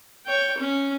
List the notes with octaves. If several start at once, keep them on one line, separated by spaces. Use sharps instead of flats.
C#5 G5
C#4